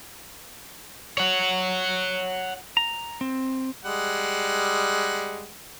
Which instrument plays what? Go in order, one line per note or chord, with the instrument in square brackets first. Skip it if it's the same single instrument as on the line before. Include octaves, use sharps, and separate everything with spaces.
[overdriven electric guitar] C#5 F#5
[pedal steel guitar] A#5
C4
[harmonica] G3 G#3 F#5